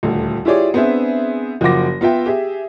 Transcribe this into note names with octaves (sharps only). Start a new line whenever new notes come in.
D#1 D2
E4 F4 G4 G#4 C#5 D5
B3 C4 D4 G#4 E5
F#1 F3 F4 F#4 D6 A#6
B3 F4 E5 G5
G4 G#4 E5